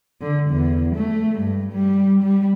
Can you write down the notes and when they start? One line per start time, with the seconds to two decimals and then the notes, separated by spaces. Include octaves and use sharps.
0.21 D3
0.50 E2
0.96 A3
1.39 G2
1.72 G3
2.23 G3